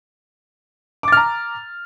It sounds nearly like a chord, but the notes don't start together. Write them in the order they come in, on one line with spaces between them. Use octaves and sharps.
D6 A6 F6 A#5